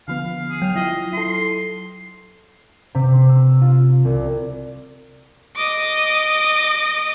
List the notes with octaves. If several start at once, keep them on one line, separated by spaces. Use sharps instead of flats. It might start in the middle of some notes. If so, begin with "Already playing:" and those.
D3 F3 B3 F5
G#4
F#3 G5 F6
E4 F4 D#5
E4 A4 C6
C3
C6
E6
F4
C2
D#5 D6